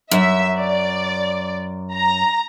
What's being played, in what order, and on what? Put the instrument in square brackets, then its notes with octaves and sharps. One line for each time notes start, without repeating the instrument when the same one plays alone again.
[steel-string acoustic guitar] F#2 [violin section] E5
[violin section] D5
A#5